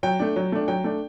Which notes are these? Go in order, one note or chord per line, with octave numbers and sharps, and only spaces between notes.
F#3 G5
A3 D4
F#3
A3 D4
F#3 G5
A3 D4